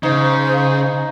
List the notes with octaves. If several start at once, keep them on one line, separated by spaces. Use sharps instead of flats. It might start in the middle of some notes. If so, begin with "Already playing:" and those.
C#3 D#4 C5